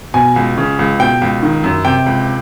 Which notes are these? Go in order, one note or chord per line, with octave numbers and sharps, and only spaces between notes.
B2 G#5
C#2
C#3
C#2
B2 G5
C#2
D#3
F#2
C3 G5
C#2